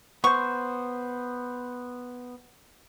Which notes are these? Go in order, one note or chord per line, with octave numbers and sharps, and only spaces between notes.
B3 C5 C#6